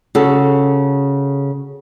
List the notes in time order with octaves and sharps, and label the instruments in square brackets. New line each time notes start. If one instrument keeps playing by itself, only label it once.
[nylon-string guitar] C#3 F#4 A4